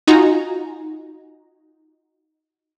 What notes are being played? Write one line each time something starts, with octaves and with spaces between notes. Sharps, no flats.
D#4 F4 F#4 G#5 A#5